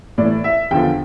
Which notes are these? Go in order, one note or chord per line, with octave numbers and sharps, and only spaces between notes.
A2 E3 D5
E5
E2 D3 F3 G5